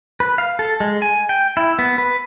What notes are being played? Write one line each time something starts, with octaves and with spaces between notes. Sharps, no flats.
B4
F5
A4
G#3
G#5
G5
E4
B3
B4